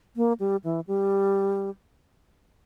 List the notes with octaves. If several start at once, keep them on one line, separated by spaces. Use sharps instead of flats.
A#3
G3
E3
G3